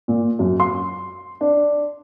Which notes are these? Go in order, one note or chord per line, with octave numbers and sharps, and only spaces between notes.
A#2
F#2
C6
D4